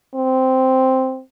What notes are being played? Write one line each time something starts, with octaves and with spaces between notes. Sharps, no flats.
C4